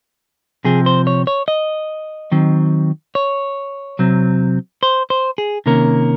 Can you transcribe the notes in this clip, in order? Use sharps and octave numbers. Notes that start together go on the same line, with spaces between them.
C3 F3 C4 G#4
C5
C#5
C#5
D#5
D#3 F#3 C4
C#5
C3 F#3 C4
C5
C5
G#4
C3 D#3 A#3 C#4 A#4